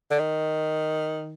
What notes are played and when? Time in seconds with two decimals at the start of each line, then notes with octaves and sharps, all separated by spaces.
0.11 D3
0.19 D#3